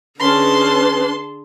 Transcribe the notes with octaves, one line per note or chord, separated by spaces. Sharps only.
D3 C#4 G#4 B4 A5 C6